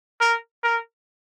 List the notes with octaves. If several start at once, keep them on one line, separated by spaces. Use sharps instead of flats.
A#4
A#4